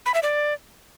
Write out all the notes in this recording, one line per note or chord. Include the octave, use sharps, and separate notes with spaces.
B5
E5
D5